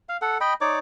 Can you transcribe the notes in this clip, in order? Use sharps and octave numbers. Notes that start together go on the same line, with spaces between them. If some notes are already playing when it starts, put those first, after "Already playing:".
F5
A4 F#5
D#5 G5 B5
D#4 C#5 D5 D6